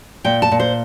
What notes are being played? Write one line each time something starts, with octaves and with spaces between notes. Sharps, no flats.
A#2 G5
A5
A#2
C5